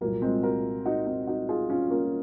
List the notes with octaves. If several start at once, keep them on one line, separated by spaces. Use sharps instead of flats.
C2 A#2 F#3 A#3
G#3 C4
F#4 A#4
D#4 F#4
C4 D#4
D#4 F#4
F4 G#4
C#4 F4
A#3 C#4